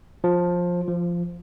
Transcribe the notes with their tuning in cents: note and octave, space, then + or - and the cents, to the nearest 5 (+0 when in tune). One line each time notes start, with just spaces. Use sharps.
F3 +15
F3 -10